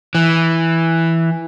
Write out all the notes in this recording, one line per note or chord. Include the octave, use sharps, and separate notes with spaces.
E3